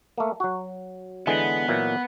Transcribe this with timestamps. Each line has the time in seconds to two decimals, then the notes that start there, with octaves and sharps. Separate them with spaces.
0.18 A3 A#3
0.40 F#3 F#4
1.27 D3 E3 G#3 B3
1.68 A#2 E3 F#3